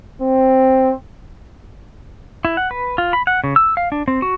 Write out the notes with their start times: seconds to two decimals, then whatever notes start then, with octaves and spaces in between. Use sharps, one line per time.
0.22 C4
2.45 E4
2.57 F#5
2.71 B4
2.98 F4
3.13 B5
3.27 F#5
3.44 C#3
3.56 E6
3.77 F5
3.92 D4
4.08 C4
4.22 F#4